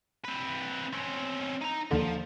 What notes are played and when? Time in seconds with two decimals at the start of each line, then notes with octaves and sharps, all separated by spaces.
0.24 C4 B4
0.93 C4 C#4
1.62 D#4 A#5
1.91 D#2 D3 F3